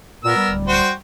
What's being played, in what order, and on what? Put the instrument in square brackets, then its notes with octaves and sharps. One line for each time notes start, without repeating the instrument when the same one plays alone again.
[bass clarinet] A#2 [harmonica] B3 A#4 E6
[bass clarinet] G3
[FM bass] D1
[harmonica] F#4 C5 G5